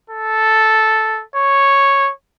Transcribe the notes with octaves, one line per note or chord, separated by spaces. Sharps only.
A4
C#5